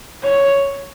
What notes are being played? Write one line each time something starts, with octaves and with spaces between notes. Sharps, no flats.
C#5